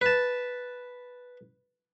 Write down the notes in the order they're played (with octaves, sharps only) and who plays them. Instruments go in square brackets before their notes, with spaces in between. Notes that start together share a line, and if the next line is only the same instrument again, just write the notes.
[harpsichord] B4 A5